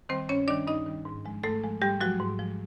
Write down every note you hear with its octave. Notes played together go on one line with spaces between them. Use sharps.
D#3 G3 C4 C5
G2 C#4 C#5
D#3 G3 D4 D5
G2 D#4 D#5
D#3 G3
G#2
F3 G#3
G#2 A3 A4
F3 G#3
G#2 G3 G4
F3 F#3 G#3 F#4
G#2
F3 G#3